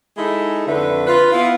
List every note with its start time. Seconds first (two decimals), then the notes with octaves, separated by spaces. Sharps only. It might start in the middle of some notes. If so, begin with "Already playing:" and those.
0.17 G#3 D#4 E4 G#4 A4
0.67 F2 D3 A3 B4 E5
1.06 F4 B4
1.32 B3 E4 F4